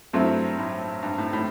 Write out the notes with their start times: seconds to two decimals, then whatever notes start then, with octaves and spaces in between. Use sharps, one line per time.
0.13 G2 F#3 A3 C4 E4
0.59 A2
1.03 G2
1.18 A2
1.33 A2